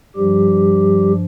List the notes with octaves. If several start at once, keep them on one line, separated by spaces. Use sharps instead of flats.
G2 F3 G3 G4